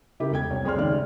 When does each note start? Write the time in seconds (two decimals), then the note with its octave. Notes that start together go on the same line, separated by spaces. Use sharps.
0.20 C#3 E4 G4 A#4
0.31 E1 A4 G5 G#6
0.50 C2 C#5
0.64 F2 G#4 C#5 D5 C6 F6
0.76 D#2 G#2 C#3 D5 F6
0.92 A3